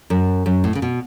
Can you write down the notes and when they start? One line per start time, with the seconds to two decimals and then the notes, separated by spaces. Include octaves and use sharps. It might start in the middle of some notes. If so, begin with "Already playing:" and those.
0.10 F#2
0.46 F#2
0.64 A2
0.75 C#3
0.82 B2